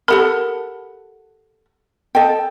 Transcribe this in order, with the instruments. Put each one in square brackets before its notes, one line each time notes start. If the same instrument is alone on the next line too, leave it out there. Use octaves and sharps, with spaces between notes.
[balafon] G4 A#4 [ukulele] A4 F#5 B5
[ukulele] A4 D#5 G5